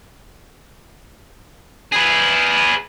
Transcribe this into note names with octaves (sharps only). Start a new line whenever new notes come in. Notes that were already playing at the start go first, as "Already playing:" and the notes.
G#4 B4